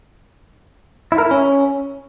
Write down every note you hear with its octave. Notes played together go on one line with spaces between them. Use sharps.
E4
A#4
E4
C#4